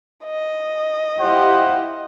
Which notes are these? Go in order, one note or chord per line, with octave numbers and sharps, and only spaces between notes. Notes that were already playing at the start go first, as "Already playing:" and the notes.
D#5
E4 F4 G4 C5 F#5